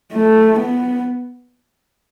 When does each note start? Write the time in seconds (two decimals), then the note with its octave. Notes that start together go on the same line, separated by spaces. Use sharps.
0.14 A3
0.60 B3